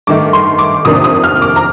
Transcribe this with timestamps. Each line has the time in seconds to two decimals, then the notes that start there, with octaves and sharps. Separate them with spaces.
0.07 G2 D#3 A3 D#4 D6
0.33 C6
0.59 D6
0.85 F2 C3 D#3 A#3 D4 D#6
1.04 D#6
1.24 F6
1.42 D6
1.56 A#5